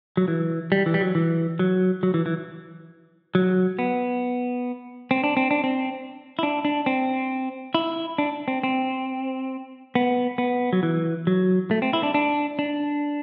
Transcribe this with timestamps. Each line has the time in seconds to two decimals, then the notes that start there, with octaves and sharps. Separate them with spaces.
0.17 F#3
0.28 E3
0.72 G3
0.86 E3
0.94 G3
1.01 F#3
1.15 E3
1.59 F#3
2.03 F#3
2.14 E3
2.26 E3
3.35 F#3
3.79 B3
5.11 C4
5.24 D4
5.37 C4
5.51 D4
5.64 C4
6.39 E4
6.43 D4
6.65 D4
6.86 C4
7.75 E4
8.18 D4
8.48 C4
8.64 C4
9.95 B3
10.38 B3
10.73 F#3
10.83 E3
11.27 F#3
11.71 A3
11.82 C4
11.93 E4
12.03 D4
12.14 D4
12.59 D4